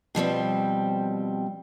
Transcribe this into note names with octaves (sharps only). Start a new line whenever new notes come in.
B2 F3 G3 C4